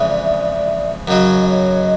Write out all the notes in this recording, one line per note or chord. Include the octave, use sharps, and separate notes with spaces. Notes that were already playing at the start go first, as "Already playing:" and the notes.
Already playing: F2 C#3 E3 G#3 D5 E5
F#2 C#3 F#3 C#5 D#5
C#5 D#5